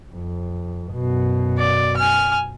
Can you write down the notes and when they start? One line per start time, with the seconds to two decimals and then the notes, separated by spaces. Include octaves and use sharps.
0.13 F2
0.93 F#2 B2
1.58 D5
1.97 G#5 F6